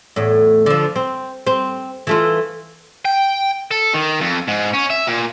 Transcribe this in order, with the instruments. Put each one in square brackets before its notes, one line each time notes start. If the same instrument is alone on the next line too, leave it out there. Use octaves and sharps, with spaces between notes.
[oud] E2 A2
D3 F3
C4
C4
E3 A3 F4
[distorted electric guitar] G5
A4
D#3
F2
G#2
C#4
E5
A#2